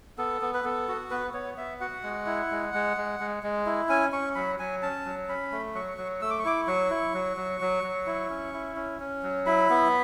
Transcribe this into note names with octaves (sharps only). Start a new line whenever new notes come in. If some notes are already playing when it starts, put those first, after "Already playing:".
B3 A4
B3
B4
B3 A4
F#4
B3 B4
B3 C#5
B3 E5
F#4 F#5
G#3
E4
G#3
G#3
G#3
G#3
G#3
E4
C#4 G#5
C#4 C#6
F#3 B5
F#3 G#5
C#4 A5
F#3
C#4 B5
A3
F#3 C#6
F#3
A3 E6
D6
C#6
E4 D6
F#3 C#6
E4
F#3
F#3
F#3
F#3
E4
C#4
E4
C#4
C#4
F#3
E4 B5
B3